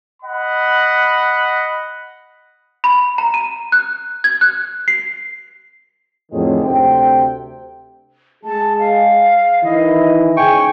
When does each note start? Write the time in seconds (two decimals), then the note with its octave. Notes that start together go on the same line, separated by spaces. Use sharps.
0.23 D#5 F#5 B5
2.84 B5
3.18 A#5
3.34 D#7
3.72 F#6
4.24 G#6
4.41 F#6
4.88 C7
6.32 F2 A2 D3 D#3 F#3 G#3
6.64 D2 C3 G5
8.44 G#3 G#4 A5
8.79 F5
9.64 D#3 E3 E4 D#5
10.37 G#2 C#3 G5 G#5 C#6